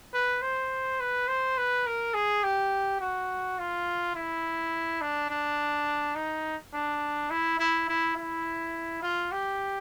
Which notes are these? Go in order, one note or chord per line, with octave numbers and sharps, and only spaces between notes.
B4
C5
B4
C5
B4
A#4
G#4
G4
F#4
F4
E4
D4
D4
D#4
D4
E4
E4
E4
E4
F4
G4